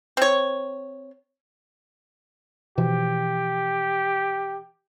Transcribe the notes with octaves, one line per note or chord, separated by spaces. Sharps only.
C4 C#5
B2 E3 F3 G4